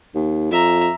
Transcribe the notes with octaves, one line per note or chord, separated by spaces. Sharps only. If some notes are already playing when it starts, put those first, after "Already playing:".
D#2
F2 E5 A#5